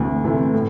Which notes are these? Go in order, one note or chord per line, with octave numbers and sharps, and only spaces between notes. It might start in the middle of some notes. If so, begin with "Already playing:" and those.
Already playing: D2 C3 E3 A3
C3 E3 A3
A2